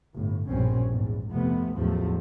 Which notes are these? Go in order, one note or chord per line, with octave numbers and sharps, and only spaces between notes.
G1 A2
A#1 E2 G2 B2 C4 C#4
E2 G#2
F2 C3 A3 B3
A1 E2 F3 F#3 A3